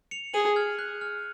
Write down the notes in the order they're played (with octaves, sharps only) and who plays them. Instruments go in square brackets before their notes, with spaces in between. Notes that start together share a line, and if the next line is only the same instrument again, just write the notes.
[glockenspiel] C#7 F7
[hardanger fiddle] G#4 [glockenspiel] D#7 F#7
[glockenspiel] F6 G#6
F#6
F6